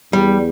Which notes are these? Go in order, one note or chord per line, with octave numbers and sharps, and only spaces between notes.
E2 G3